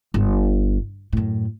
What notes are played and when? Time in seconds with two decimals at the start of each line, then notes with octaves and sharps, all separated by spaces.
0.14 G1
1.13 F#2 A2